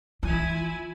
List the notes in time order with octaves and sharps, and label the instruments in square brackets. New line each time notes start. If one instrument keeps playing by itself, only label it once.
[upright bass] E3 [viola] E4 G#5 [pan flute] F4